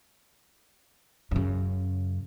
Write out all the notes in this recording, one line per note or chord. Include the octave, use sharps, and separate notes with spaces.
F#2 C#3